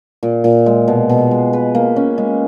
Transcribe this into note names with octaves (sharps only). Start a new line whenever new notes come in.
A#2
A#2
G#3
B2
B2
G#3
B4
A#3
C#4
G#3